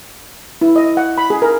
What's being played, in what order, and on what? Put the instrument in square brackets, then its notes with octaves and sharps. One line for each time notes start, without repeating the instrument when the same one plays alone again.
[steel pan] E4
D#5
F#5
B5
G#4
A#4